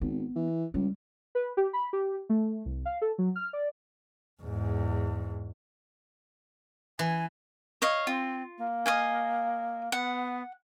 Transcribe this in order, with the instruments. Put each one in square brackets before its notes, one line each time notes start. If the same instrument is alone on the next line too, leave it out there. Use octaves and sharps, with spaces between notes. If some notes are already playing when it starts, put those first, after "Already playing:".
[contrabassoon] G#1 [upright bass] B3
[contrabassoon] E3
[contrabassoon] C#2 [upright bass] G3
[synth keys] B4
G4
B5
G4
A3
C2
F5
A4
F#3
F6
D5
[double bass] E2 G#2
[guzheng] E3 [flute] G#5
[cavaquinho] C#5 D#5 F5
[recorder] C4 [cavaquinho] F4
[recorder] A#3
[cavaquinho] D#5 F5 G#5
[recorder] B3 [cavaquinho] F#5